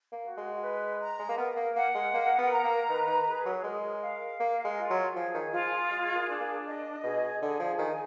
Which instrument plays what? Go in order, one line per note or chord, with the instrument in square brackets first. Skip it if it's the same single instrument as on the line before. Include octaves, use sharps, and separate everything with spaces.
[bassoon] A#3
[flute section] F#4
[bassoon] G#3
[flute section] B4
A#5
[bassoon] G#3
A#3
[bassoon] B3 [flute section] A#4
[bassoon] A#3
[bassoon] A#3 [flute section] F#5
[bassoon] G#3
[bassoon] A#3 [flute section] A#4
[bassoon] B3
[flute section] A#5
[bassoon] A#3
[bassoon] D#3 [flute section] B4
[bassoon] D#3
[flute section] G#4
[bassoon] F#3
[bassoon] G#3 [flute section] A#4
[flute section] F5
[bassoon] A#3 [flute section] A#4
[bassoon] G#3
[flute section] F4
[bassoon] F#3
[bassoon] F3 [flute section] G#4
[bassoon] D#3
[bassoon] F3 [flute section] F4
[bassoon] G#3 [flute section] G#4
[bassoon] A#3
[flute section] D4
[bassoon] A#3
[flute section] D#5
[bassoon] B2 [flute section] G#4
[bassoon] D3 [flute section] G#4
[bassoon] F3
[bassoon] D#3 [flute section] G#5